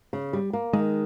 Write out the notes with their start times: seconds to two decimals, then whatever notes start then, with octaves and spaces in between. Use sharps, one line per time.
0.13 C#3
0.33 G3
0.53 A#3
0.73 D#3 G#3